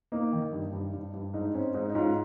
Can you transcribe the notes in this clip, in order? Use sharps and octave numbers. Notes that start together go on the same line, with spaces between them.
A#3 D#4
D#3
G2
G2
G2
G2
G#2 D#4
C4 C#4
G#2 D#4
D#4
G#2 C#4 F4